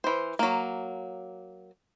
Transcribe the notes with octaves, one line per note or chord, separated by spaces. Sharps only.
E3 C5
F#3 A#3